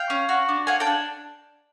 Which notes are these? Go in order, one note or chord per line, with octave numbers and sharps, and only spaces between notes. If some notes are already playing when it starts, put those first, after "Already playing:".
Already playing: F5 G5
C#4
F#4
D4
F4 F#5 G#5
G5 A5
D4